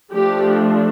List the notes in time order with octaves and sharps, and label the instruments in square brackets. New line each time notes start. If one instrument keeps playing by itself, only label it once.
[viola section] F3 A3 D4 G4